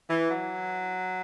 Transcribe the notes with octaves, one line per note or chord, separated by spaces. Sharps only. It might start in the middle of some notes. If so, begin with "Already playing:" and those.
E3
F#3